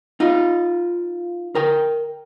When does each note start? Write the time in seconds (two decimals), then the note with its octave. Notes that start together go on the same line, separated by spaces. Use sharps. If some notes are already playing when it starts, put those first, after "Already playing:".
0.20 D#4 F4
1.55 A#4 G5